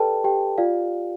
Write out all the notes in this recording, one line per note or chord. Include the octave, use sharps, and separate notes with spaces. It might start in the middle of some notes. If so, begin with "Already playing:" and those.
Already playing: G4 A4 B4 D5 G5 A5
G4 G5
F4 D5 F5